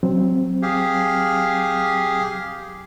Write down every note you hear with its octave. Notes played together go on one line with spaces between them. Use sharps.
F#3 C4
G4 G#4 F5